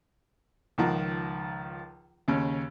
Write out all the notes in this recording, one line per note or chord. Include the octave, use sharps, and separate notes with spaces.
C#2 D#3 F3 F#5 A#5
D#2 C#3 C#4